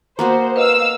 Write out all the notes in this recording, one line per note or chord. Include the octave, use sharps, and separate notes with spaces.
A#3 B3 F#4 C5
B4 D#5 F5 E6